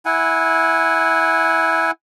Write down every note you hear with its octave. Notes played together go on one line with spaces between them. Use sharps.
E4 F#5 G#5